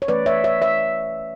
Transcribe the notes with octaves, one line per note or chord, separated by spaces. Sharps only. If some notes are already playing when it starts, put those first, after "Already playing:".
C#5
E3 A3 C#4 B4 D5
C#5 E5
C#5 E5
C#5 E5